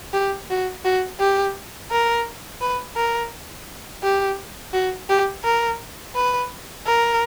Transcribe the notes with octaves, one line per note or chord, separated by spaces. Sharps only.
G4
F#4
F#4
G4
A#4
B4
A#4
G4
F#4
G4
A#4
B4
A#4